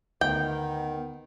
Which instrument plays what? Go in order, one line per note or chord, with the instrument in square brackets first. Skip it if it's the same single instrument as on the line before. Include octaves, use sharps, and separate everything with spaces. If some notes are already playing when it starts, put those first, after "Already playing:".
[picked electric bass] D2 [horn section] D#3 [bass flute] B3 [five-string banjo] G5